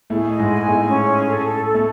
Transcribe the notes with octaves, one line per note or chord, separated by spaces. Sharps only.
A2 A3 G#4
D#5
G#2 G#3
G#5
A2 A3 G#4
C#4
G#4
A4
A4
A4
A3